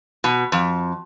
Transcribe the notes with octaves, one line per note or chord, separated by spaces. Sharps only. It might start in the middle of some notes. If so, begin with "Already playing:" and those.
B2
F2